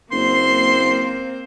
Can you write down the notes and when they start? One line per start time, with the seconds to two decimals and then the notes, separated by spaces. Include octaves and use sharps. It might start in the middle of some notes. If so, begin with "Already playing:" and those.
0.12 F#1 A#3 C4 C5 C6